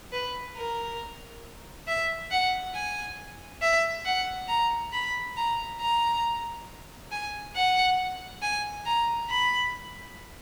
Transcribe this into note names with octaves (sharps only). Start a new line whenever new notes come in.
B4
A#4
E5
F#5
G#5
E5
F#5
A#5
B5
A#5
A#5
G#5
F#5
G#5
A#5
B5